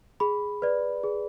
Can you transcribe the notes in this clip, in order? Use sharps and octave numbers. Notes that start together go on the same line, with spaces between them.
G#4 B5
B4 D5
G#4